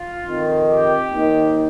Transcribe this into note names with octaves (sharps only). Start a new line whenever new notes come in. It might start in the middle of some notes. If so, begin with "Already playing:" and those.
Already playing: F4
F2 D#3
G4
D#2 D#3